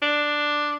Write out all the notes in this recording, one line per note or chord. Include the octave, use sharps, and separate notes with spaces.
D4